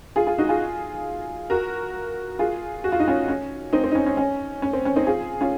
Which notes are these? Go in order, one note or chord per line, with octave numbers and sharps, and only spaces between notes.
F4 G#4
F4 G#4
D#4 F#4
F4 G#4
F#4 A#4
F4 G#4
F#4
F4
D#4
C#4 F4
C#4
C4 D#4
C4
D#4
C#4
C#4
C#4
C#4
C4
C#4
C4 D#4
F4 G#4
C#4 F4